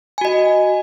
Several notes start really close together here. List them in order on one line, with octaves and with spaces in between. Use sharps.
G#5 F#4 D#5